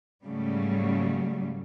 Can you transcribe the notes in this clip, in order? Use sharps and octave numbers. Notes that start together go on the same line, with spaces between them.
G#2 C#3 F#3 G3 A3